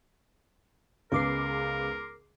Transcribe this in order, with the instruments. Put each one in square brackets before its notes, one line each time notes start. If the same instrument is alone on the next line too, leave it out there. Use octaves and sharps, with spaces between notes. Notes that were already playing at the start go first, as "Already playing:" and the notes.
[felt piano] C#2 [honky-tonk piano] G#3 B3 [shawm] A#4 [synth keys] C6 D6 C7